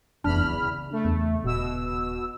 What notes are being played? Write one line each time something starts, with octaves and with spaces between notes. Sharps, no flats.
F1 E2 D4 B5 F6
C#3
A3
E2
D#1 B2 E6